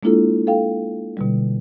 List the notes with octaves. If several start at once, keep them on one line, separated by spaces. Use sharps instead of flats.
G#3 A#3 D4 E4 F4 A4
A4 F5 G5
B2 D3 G3